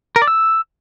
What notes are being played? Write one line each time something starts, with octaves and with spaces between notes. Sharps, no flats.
A#4
D5
E6